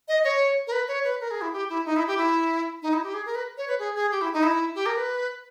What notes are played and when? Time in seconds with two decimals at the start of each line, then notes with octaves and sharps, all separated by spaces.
0.08 D#5
0.24 C#5
0.67 A#4
0.72 B4
0.88 C#5
1.04 B4
1.20 A#4
1.31 G#4
1.41 E4
1.53 G4
1.69 E4
1.85 D#4
1.96 E4
2.07 G4
2.17 E4
2.82 D#4
2.93 E4
3.03 G4
3.14 G#4
3.26 A#4
3.35 B4
3.57 C#5
3.68 B4
3.79 G#4
3.95 G#4
4.12 G4
4.21 E4
4.33 D#4
4.43 E4
4.75 G4
4.86 A#4
4.97 B4